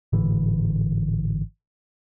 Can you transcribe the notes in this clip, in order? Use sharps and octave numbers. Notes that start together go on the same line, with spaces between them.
G#1 A2 D3 E3